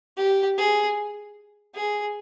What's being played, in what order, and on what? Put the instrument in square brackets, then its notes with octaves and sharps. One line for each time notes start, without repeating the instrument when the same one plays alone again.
[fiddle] G4
G#4
G#4